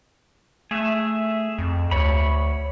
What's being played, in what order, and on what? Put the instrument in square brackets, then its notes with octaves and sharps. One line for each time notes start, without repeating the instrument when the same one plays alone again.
[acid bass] A3 [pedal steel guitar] G#4 E5
[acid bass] F2
[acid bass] D2 [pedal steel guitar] C#5 B5